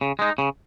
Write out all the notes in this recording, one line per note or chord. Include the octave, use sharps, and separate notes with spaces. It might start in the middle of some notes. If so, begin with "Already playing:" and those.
C#3
G#3 D#4
C#3